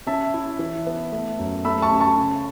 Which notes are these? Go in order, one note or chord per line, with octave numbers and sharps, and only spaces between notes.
C#4 E5 A5
E4
E3
B3
A3
F#2
A3 B5 E6
A5 C#6
C#4
A5 C#6
C#3